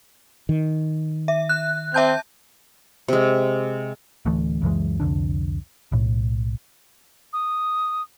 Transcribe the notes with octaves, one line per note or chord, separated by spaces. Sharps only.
D#3
E5
F#6
C4 E5 A5 G6
C3 G#3
D1 D2 E3 A3
C#2 F#2 E3 G#3
C2 F2 D3 D4
B1 A2
D#6